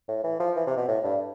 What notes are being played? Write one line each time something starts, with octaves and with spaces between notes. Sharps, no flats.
A2
E3
F3
E3
C3
B2
A2
G2